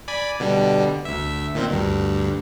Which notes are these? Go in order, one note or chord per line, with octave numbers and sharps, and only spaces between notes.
D5 G#5 B5
B2 D3 G3
D2 E5
A#2 D#3 C4
D2 G2